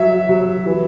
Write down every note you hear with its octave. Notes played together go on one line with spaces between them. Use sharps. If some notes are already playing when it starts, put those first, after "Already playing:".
Already playing: F#3 E5
F#3
E3